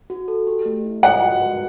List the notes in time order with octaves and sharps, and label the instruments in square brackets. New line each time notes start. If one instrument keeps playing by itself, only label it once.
[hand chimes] F#4
A4
G4
A3
E4
[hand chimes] D#5 [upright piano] F#5
[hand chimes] F#4
B4